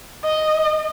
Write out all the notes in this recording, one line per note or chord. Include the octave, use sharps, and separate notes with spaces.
D#5